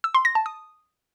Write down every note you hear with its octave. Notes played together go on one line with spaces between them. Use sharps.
E6
C6
A#6
A5
D#6